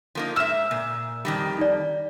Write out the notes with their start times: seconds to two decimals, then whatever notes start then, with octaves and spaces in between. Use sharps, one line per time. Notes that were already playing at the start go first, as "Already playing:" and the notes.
0.15 F3 A#3 D#4
0.36 G#2 E5 E6 F6 E7
0.71 A#2
1.25 F2 D#3 G3
1.58 D#4 D5